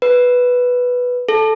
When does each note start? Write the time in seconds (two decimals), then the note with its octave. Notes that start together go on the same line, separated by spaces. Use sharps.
0.02 B4
1.29 A4